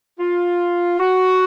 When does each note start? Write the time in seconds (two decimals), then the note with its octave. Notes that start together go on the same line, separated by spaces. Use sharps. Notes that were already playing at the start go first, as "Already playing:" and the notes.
0.20 F4
0.99 F#4